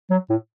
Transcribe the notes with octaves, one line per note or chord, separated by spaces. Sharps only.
F#3
A2